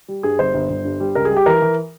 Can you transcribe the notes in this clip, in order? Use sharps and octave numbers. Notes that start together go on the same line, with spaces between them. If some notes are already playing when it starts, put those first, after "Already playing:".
G3
G2 G#4
G1 C5
G1
G1
G2
G3
C#2 A#4
G#4
G3
G4
E3 A#4
E3